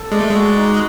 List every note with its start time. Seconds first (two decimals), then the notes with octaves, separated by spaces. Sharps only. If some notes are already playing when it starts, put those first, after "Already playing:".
Already playing: A4
0.11 G#3 D5
0.20 A3
0.30 G#3 F#4
0.55 D#4